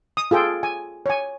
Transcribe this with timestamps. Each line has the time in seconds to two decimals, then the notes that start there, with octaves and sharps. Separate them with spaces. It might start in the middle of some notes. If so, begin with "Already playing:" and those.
0.17 D#6
0.31 F4 G#4 A4 G5
0.63 G#5
1.06 C#5 G#5